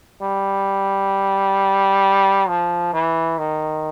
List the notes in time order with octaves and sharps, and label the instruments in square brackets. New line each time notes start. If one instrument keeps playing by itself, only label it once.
[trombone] G3
F3
E3
D#3